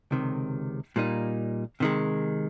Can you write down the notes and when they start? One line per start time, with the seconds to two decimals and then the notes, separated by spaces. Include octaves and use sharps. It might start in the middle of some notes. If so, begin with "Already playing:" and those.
0.11 C#2 C3 D#3
0.96 A#2 G3 A#3 D#4
1.80 C3 D#3 G#3